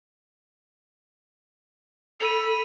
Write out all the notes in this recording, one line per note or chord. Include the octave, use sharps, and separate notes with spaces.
A4 B5 D#7 F7